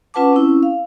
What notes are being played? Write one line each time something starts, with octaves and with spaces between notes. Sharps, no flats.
C#4 F4 B4 F#5 A5 D6
C4 C#4 E4
F5